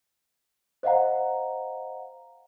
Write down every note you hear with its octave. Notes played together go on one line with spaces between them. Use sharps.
C5 D#5 F5 F#5 A#5